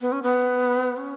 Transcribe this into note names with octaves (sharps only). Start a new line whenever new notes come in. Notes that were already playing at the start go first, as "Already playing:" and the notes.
B3
C#4
B3
C#4